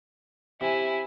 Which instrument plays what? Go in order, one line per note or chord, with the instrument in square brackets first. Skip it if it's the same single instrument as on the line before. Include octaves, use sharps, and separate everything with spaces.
[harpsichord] C3 [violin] E4 G#5